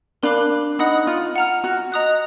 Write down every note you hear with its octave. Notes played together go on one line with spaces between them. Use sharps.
D4 A#4 F5 B5 D6 F#6
D#4 D#5 F#5 B5 D#6 F#6
F4
F#5 A#5 F6
F#4
D#5 A#5 D#6 F#6